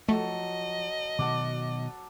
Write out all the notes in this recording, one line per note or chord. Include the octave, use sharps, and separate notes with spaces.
F3 F#3 A3 A4 D#5
B2 D#3 F#3 A4 F#5 D6